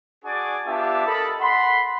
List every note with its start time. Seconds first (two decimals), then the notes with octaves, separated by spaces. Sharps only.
0.24 D4 F#4 G#4 D5 G#5 D6
0.66 B3 D4 F4 G4 E5 A5
1.07 A4 A#4 D#5 A5 B5
1.40 F#5 B5 C6